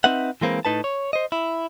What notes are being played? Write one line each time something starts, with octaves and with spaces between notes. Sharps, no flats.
C4 D#4 B4 E5 F#5
E3 G#3 A#3 C4 B4
A2 D#4 B4 A5
C#5
C5 D#5
E4